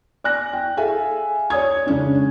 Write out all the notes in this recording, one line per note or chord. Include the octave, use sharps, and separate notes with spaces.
D5 G#5 F#6 A#6
G5
G#4 A4 E5 F5 G#5
C#5 D5 D#6 G#6
C#3 G#3 C#4 D4